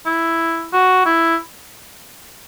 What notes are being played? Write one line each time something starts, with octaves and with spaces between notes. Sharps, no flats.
E4
F#4
E4